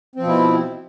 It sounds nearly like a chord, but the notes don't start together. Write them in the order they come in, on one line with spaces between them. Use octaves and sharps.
C4 F3 B2 E4